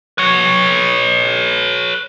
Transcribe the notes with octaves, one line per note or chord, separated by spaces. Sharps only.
B4 C#5